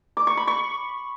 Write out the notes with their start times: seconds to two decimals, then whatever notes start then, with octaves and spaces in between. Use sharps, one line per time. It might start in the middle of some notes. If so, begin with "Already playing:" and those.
0.17 D6
0.27 C#6
0.37 B5
0.47 C#6